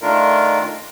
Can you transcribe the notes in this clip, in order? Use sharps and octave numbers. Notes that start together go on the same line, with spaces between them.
D#3 A3 D4 F4 A#4